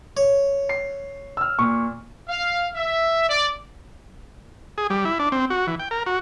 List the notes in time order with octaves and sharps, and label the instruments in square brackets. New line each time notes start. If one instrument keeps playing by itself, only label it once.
[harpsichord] C#5
[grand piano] C7
E6 F6
A#2 C#6
[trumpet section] F5
E5
D5
[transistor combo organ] G#4
G3
E4
D4
C4
F#4
E3
G5
A#4
F#4